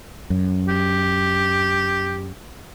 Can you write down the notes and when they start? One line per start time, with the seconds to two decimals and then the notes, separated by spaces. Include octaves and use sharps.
0.30 F#2
0.68 G4